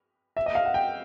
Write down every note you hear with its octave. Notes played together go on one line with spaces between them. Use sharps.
E5
D#5
F5
F#5
G5